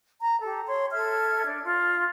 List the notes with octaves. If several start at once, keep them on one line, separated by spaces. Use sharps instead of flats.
A#5
G4 A4
C#5 C6
A4 E5 F6 G#6
D4
F4